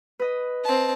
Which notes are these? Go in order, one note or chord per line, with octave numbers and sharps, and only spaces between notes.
B4 D#5
C4 A5